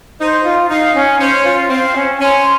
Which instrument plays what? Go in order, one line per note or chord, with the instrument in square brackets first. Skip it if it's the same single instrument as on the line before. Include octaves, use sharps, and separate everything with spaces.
[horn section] D#4 [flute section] C5
[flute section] F4
[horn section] D#4 [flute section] F5
[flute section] C#4
[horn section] C#4 [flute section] C5
[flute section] F4
[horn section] C4 [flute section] F5
[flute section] C#4
[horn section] C#4 [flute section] C6